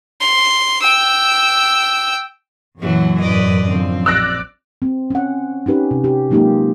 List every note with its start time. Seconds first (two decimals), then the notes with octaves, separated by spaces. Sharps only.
0.20 C6
0.82 G5 E6
2.80 F#2 A#2 E3 F#3
3.21 E2 A2 B4 D5 D#5
3.69 D3 F3 C4
4.06 A#1 D5 E6 F#6 A#6
4.82 C4
5.10 C#4 F#5
5.66 C#4 D#4 G4 B4
5.91 C3
6.04 G4
6.30 F#3 G#3 A#3 D#4 F4 G4